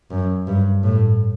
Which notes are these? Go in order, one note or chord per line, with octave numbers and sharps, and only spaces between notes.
F#2
G2
A2